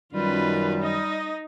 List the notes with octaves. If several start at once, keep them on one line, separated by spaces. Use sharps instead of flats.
F#2 D#3 G3 F4 B4
D#4 D#5